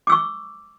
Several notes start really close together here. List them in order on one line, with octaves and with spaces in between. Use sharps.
D6 E6 C#6